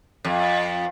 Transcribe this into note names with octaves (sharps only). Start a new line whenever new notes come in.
F2